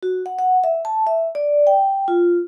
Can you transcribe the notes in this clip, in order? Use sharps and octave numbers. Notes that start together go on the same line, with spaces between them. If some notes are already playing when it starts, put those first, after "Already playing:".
F#4
F#5
F#5
E5
A5
E5
D5
G5
F4